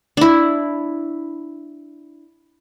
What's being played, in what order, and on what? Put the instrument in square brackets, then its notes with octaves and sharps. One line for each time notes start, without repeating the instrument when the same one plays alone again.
[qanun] D4 E4